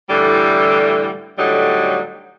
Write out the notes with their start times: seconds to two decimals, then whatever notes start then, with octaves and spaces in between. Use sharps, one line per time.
0.10 A2 D3 E3 G3
1.38 A2 D3 F#3 G3 D#4